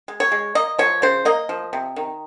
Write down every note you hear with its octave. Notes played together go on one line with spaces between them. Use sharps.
G#3
C#5
G#3
A#3 D#5
F3 C#5
C#3 C5
A#3 D#5
F3
C3
D#3